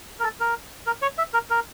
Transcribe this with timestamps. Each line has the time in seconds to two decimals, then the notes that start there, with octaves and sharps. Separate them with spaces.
0.20 A#4
0.23 A4
0.40 A#4
0.87 A#4
1.02 C#5
1.18 E5
1.33 A#4
1.50 A#4